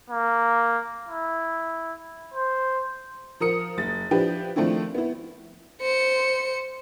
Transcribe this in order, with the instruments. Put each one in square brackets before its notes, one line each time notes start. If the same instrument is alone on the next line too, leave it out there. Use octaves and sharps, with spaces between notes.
[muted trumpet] A#3
E4
C5
[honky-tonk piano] F3 A#4 D#6 C#7
F#1 A6
F3 D4 E4 G4 B4
D#3 F3 A3 C4 D4 E4
B3 E4
[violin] C5 C#7